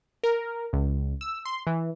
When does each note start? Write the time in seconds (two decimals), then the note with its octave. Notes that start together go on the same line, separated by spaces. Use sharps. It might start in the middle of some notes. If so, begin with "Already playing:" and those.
0.23 A#4
0.73 C#2
1.21 E6
1.45 C6
1.67 E3